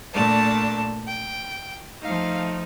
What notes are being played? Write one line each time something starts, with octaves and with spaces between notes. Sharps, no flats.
A#2 A3 D4 A5
G5
F3 A3 D#4 F5